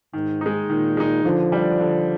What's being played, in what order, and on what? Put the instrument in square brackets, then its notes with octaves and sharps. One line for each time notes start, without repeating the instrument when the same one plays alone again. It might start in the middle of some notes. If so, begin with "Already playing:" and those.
[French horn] G#2 [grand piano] D#3
[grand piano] G#3 D#4
[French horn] A#2 [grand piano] D#3
[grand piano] G#3 D#4
[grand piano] D3 [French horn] F3
[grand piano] G3 D4
D3